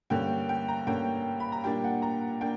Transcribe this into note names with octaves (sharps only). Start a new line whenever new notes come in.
G2 D3 A#3 C#4 G5
G5
A#5
G2 D3 A#3 C#4 G5
B5
A#5
A#2 G3 A#3 D4 G5
F#5
A#5
A#3 D4 G5